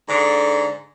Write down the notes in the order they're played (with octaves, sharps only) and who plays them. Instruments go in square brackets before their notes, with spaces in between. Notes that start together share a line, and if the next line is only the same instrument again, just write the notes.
[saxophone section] G#2 D3